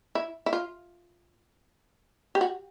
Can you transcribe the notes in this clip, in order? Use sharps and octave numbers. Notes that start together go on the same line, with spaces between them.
E4
E4
F4
G4
F#4